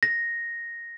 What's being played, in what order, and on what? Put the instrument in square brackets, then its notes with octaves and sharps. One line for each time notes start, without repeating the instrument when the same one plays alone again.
[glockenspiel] A#6